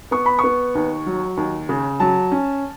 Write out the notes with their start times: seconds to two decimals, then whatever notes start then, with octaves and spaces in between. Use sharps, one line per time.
0.11 B3 C#6
0.26 B5
0.39 B3 C#6
0.75 D#2
1.06 F#3
1.37 D#2
1.69 C#3
2.00 F#3 A5
2.32 C#4